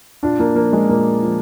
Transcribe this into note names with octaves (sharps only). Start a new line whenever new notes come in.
A#2 D4 F4
A#3 D4
F3 A#3
G#3
A#2 A#3
F3